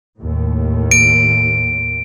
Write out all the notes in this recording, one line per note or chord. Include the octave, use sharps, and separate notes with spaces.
D#2 A2
D7